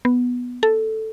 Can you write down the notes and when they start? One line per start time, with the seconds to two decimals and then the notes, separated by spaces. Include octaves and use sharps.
0.05 B3
0.63 A4